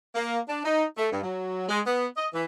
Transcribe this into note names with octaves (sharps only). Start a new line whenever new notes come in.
A#3
D4
D#4
A3
G2
F#3
G#3
B3
D#5
E3